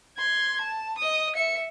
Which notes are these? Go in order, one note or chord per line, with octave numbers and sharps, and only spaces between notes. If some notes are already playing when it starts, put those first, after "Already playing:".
C6 G#6
A5
D#5 D#6
E5 C#7